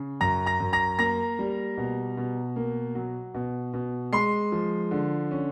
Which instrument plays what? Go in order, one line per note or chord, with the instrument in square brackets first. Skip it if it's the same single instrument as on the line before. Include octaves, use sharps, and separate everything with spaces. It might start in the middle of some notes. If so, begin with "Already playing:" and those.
Already playing: [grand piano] C#3
F#2 A#5 A#6
A#5 A#6
F#2
A#5 A#6
A#3 A#5 A#6
G3
B2
B2
A#3
F#3
B2
B2
G#3 C6 C7
F3
D3
C#4